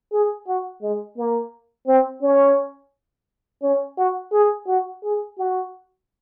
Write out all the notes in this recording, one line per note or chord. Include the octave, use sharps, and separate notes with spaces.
G#4
F#4
G#3
A#3
C4
C#4
C#4
F#4
G#4
F#4
G#4
F#4